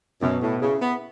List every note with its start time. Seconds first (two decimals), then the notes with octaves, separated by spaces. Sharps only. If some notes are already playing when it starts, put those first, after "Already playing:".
0.21 F#2 B2
0.42 A2
0.61 C#3 E4
0.80 B3